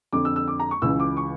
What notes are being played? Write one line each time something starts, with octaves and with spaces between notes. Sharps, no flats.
F2 D3 D6
E6
E6
D6
A#5
C#6
C#2 C#3 E3 E6
D6
C#6